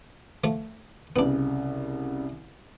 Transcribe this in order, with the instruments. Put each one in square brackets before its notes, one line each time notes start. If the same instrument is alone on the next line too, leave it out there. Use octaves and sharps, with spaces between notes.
[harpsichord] F3 A3
[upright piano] C2 C#3 [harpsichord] B3 D4